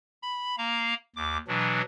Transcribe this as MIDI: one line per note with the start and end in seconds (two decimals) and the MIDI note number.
0.22 0.56 83
0.58 0.94 58
0.58 0.94 77
0.58 0.94 82
1.16 1.37 39
1.16 1.37 86
1.48 1.81 47
1.48 1.81 52
1.48 1.81 54
1.48 1.81 62